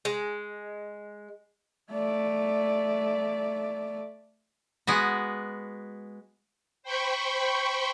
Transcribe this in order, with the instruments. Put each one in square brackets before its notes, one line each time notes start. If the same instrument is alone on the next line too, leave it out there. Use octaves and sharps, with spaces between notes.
[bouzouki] G#3
[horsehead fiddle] A3 D5
[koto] G#3 B3 F#4
[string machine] C5 G5 B5 C#6